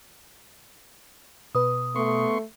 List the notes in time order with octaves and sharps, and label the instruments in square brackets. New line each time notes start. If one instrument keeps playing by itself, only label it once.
[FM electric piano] B2 B4 [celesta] D#6
[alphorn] A3 [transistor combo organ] B3 C6 C#6